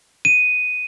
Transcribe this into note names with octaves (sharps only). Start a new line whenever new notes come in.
D#7